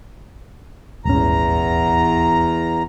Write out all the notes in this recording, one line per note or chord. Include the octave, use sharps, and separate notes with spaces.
D#1 G#1 E2 C#4 A#5